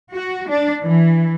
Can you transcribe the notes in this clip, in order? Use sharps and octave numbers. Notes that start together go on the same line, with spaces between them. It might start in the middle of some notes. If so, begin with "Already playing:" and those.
F#4
D4
E3